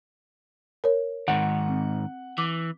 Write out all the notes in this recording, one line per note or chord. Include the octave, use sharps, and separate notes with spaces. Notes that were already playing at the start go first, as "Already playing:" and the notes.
A#4 C#5
G#2 D#3 F#5
C4
E3 D6